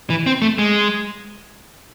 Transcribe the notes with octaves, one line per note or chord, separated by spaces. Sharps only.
E3
C4
A3
G#3